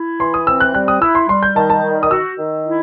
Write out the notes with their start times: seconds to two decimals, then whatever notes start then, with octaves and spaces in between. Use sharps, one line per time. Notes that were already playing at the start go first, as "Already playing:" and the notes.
Already playing: E4
0.19 E3 C6
0.34 D#6
0.47 C4 E6
0.60 F#6
0.74 G3 F#6
0.88 D#6
1.02 E4 E6
1.15 C6
1.29 G3 C6
1.43 G6
1.56 D#3 A5
1.70 A5
1.84 G3
2.03 D#6
2.11 F#4 E6
2.39 D#3
2.66 E4